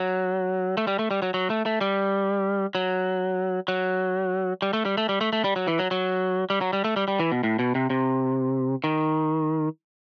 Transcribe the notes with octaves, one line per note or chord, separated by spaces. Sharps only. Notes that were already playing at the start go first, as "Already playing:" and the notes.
Already playing: F#3
A3
G3
A3
G3
F#3
F#3
A3
A3
G3
F#3
F#3
G3
A3
G3
A3
G3
A3
A3
G3
F#3
E3
F#3
F#3
G3
F#3
G3
A3
G3
G3
E3
B2
A2
B2
C3
C3
D#3